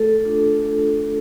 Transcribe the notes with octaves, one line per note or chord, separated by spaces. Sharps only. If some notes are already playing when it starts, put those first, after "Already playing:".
Already playing: A3 A4
D4 F4